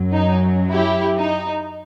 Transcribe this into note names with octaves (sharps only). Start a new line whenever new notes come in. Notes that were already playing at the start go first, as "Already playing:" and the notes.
Already playing: F#2 F#3
D#4
E4 G4
D#4